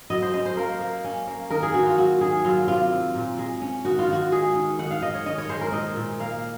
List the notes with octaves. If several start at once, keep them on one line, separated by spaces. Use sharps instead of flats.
F#3 D#5
C5
C#4 D#5
C5
A#3 A#4
A#3
C#4
A#3
D#3 A#4
G#4
D#3 F#4
F4
F#3 F#4
D#3 G#4
F#3 F4
C3 F4
C4
A#2
G#3
C#4
D#3 F#4
F4
D#3 F#4
G#3 G#4
D#3
D#3 F#5
F5
D#3 D#5
C#5
D#3 D#5
C#5
G#3 C5
A#4
A#2 D#5
A#2
A#3 F5